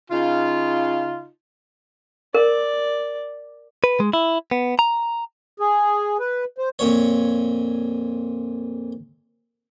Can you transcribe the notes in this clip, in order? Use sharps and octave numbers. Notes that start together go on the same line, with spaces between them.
C#3 D#4 F4
A#4 D5
B4
G#3
E4
B3
A#5
G#4
B4
C5
F2 A#2 C#5